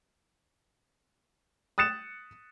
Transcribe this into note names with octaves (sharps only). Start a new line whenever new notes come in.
D#6 F#6 A6 C#7 E7